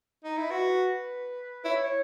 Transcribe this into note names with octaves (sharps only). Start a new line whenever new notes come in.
D#4
E4
F#4 B4
E4 C#5
C#5